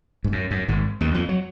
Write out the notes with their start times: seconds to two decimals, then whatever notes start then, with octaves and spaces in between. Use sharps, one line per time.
0.24 G#2
0.32 F#2
0.51 F#2
0.68 G#1 G#2
1.01 D#2 D#3
1.14 F2 F3
1.29 F#3